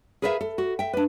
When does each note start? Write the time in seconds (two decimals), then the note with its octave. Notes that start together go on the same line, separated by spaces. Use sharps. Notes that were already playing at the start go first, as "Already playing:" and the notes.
0.22 G#4 A#4 B4 C#5 E5 F5
0.41 A4
0.58 F#4
0.79 E5 G5
0.93 D4 B4